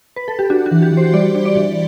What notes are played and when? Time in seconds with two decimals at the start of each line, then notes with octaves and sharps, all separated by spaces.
0.16 B4
0.28 A4
0.39 G4
0.50 D4 F#4
0.66 F#4
0.71 E3
0.82 G4
0.92 E3
0.97 C5
1.13 G3 D5
1.35 D4
1.45 D5
1.56 E3